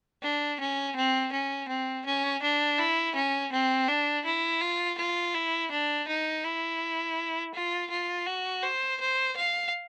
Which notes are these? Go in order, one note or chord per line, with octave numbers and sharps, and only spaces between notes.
D4
C#4
C4
C#4
C4
C#4
D4
E4
C#4
C4
D4
E4
F4
F4
E4
D4
D#4
E4
F4
F4
F#4
C5
C5
F5